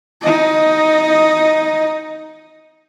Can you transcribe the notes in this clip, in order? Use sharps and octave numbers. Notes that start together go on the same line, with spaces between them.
D#4 D#5